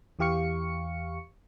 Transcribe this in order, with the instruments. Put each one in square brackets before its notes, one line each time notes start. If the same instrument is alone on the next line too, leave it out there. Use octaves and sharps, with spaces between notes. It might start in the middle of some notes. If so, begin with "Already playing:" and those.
[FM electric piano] E2 E3 G4 F5 C#6 C#7